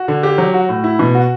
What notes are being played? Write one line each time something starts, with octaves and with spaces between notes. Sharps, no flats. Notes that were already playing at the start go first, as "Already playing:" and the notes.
Already playing: F#4
D3
G4
F#3
F#4
A2
E4
B2
F#4